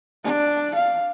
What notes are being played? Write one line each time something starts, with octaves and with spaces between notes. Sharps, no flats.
D4
F5